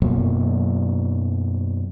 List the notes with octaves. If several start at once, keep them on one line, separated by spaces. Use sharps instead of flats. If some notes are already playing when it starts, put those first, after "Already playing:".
F#2 B2 F#3 A#3